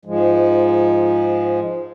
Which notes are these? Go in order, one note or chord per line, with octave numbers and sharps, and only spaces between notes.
G#2 F3 G#3